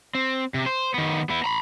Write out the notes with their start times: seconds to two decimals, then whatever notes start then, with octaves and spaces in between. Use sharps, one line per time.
0.15 C4
0.54 C3
0.66 C5
0.94 D#3 B3
1.30 B3 E4
1.44 A#5 B5